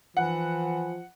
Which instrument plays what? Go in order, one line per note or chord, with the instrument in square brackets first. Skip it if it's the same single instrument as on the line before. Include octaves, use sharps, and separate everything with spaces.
[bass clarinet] E3 [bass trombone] F3 [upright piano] F#5